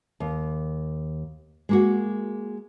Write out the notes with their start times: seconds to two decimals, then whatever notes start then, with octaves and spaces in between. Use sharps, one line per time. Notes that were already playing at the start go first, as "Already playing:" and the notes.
0.20 D#2
1.69 G#3 A#3 F#4